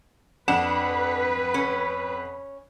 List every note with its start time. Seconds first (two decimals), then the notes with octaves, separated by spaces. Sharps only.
0.48 F2 D4 B4 F#5 E7
1.54 C#4